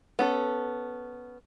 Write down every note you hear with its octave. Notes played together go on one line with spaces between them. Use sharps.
B3 C#4 A4